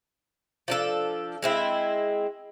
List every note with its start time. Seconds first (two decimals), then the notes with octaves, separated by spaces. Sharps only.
0.68 F3 D4 A4
1.42 G#3 C4 E4